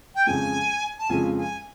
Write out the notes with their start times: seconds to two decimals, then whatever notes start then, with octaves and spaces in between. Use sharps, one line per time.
0.15 G5
0.26 F2 C#3 F3 G#3 G#5
0.99 A5
1.09 F2 C#3 F3 G#3 G#5
1.38 G#5